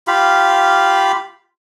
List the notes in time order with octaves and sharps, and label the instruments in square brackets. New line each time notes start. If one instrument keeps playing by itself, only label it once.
[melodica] F4 G4 F5 B5